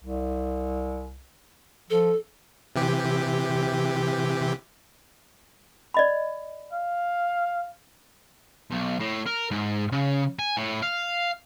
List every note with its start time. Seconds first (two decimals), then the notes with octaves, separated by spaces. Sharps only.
0.04 C2
1.90 F3 A4
2.76 C3 E3 G4
5.94 D5 D#5 B5
6.73 F5
8.71 B1
9.00 A2
9.26 A#4
9.51 G#2
9.92 C#3
10.39 G#5
10.57 A2
10.83 F5